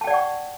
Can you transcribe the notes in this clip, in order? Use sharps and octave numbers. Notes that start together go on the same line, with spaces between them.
D5 F#5 G5 A5 C#6